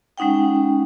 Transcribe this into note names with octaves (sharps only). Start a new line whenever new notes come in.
G#3 C#4 D#4 F#5 G5